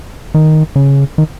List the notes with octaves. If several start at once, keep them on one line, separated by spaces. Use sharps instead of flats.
D#3
C#3
D#3